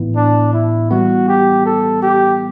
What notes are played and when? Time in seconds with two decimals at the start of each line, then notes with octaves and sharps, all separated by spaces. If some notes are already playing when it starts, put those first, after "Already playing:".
Already playing: A2 E3 B3 E4
0.16 D4
0.53 E4
0.91 E3 G3 B3 F#4
1.28 G4
1.65 A4
2.02 G4